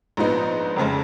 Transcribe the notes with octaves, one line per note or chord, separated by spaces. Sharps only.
A#1 G#2 F3 B3 D#4
F1 F2 C#3 G#3